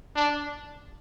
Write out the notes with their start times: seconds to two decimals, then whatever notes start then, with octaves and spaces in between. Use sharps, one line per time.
0.16 D4